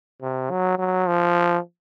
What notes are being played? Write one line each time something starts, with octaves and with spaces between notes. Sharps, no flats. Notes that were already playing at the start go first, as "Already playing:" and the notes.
C3
F#3
F#3
F3